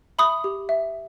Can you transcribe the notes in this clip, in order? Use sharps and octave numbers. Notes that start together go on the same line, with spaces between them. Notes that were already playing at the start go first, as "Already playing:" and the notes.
E5 B5 D#6
G4
E5